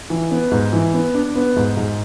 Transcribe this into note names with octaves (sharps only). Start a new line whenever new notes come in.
E3
B3
G#2
E3
B3
D4
B3
G#2
G#2